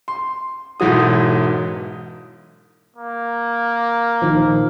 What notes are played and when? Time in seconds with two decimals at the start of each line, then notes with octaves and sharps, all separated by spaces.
0.08 C6
0.80 E1 G#2 E3 F#3 D#6
2.96 A#3
4.22 A#1 D#3 F3